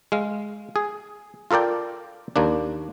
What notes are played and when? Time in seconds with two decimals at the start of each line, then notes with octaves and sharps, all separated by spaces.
0.12 G#3 F5
0.76 G#4
1.51 F4 A4 A#4 D5 G5
2.36 D#2 A#3 D4